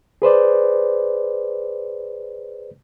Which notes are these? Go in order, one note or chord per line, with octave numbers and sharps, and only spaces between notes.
G#4 B4 C5 D5